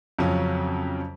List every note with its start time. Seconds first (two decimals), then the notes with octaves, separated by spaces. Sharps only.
0.19 F2 C#3 F3 F#3 C#4